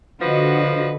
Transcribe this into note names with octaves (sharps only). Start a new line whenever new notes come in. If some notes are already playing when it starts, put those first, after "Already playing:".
D3 F3 F#4 B4 D#5